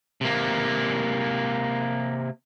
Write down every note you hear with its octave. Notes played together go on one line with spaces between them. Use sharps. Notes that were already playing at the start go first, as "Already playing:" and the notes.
C3 A#3